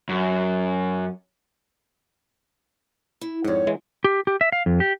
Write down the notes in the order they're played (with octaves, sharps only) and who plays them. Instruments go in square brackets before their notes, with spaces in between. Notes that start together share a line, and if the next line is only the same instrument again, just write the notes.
[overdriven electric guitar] F#2
[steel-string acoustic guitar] E4
[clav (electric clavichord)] F2 G#2 [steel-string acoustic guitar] G3 F#5 [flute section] C#5
[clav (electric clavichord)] E3 G#3
[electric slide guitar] G4
G4
E5
F5
F2
G4